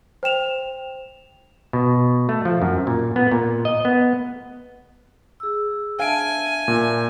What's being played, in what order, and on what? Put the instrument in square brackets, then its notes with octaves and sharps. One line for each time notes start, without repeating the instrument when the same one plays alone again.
[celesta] C5 G5 E7 F7
[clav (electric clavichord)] B2
A3
F3
F#2
A#2
B3
A#2
D#5
B3
[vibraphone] G#4 E6
[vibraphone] D4 E5 A5 [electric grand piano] F5 D7 [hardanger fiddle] G#5
[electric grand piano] A#2